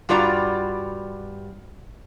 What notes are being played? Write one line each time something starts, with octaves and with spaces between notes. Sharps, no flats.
G2 G3 F4 F#4 D5 A#5